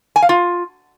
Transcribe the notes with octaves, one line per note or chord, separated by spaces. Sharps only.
G#5
F5
F4